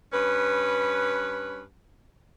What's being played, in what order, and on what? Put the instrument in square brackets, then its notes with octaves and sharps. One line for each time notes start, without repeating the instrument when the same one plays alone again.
[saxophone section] G2 C#4 B4